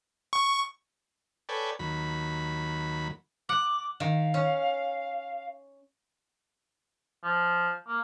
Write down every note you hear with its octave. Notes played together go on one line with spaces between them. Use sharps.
C#6
A4 B4 C#5 D5 G5 G#5
D#2 F#3 B5
F#5 D6
D#3 F5
C#4
F3
A#3